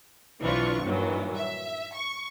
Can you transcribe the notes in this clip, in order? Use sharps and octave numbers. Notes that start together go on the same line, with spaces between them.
B1 E3 C4 D4 F4 C#6
G2 A#2 D#3 E3 F#3
E5
C#6